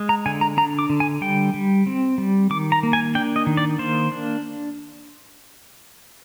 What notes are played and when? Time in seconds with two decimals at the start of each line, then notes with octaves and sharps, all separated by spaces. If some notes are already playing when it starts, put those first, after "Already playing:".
Already playing: G#3
0.09 A#5
0.26 D3 G#5
0.41 A#5
0.57 D4 A#5
0.79 D6
0.90 D3
1.00 G#5
1.21 G3 G5
1.54 G3
1.87 C4
2.18 G3
2.50 D#3 D6
2.72 A#5
2.83 A#3
2.93 G#5
3.15 D4 G5
3.36 D#5
3.47 D#3
3.57 D5
3.78 A#3 C5
4.12 D4